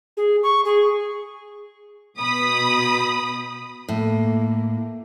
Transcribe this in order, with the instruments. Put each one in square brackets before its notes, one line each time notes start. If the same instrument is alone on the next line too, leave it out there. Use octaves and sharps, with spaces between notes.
[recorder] G#4
C#6
G#4
[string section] B2 B5 D#6
[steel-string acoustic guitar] A2 [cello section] A#3